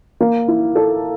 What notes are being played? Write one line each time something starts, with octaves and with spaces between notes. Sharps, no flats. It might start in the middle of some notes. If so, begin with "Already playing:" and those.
A#3
E4
A4